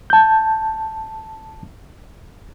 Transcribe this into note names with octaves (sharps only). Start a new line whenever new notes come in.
A5 G6